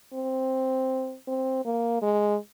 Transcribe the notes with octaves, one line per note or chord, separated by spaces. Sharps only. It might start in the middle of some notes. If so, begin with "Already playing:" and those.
C4
C4
A#3
G#3